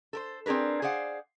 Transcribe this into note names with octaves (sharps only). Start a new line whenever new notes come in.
A4 A#4 C5
C4 D4 G#4 A#4 B4
G#4 C5 D5 F5 F#5